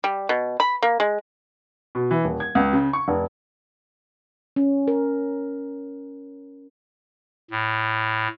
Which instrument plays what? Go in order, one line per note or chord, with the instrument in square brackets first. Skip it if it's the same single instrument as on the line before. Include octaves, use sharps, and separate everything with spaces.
[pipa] G3
B2
B5
A#3
G#3
[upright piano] B2
E3
D#1
G#6
C#2
C#3
C#6
F1
[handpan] C#4
A#4
[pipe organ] A2